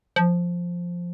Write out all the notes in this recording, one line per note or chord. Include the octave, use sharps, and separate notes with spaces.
F3